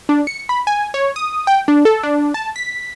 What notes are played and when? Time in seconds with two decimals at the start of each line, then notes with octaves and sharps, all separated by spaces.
0.09 D4
0.27 C#7
0.49 B5
0.67 G#5
0.94 C#5
1.16 D#6
1.47 G5
1.68 D4
1.85 A4
2.03 D4
2.34 A5
2.56 B6